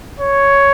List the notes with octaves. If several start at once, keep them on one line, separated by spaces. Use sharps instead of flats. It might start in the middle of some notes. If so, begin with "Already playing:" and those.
C#5